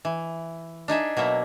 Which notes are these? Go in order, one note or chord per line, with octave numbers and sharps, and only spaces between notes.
E3
D4 D#4 G#4 E5
B2 F#3 A#3 E5